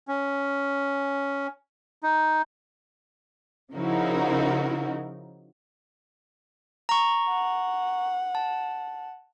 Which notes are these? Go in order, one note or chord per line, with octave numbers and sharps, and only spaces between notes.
C#4
D#4
C#3 F3 D#4 E4 F#4 A#4
A#5 C#6
F#5
A5